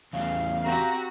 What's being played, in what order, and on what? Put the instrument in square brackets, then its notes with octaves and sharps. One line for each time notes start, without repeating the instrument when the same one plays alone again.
[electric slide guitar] E2 C#3 [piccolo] F5
[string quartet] C4 F#4 G4 [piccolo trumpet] A#5